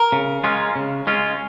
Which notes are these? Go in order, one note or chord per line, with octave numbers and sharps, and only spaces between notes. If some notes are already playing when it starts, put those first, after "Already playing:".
Already playing: A#4
C#3
G#3 C#4 F4
C#3
G#3 C#4 F4